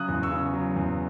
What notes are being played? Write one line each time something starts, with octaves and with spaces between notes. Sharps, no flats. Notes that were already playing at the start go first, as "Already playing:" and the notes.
Already playing: C#3 F#3 D#6 F#6
E2
C#6 E6
C#3
F#3
E2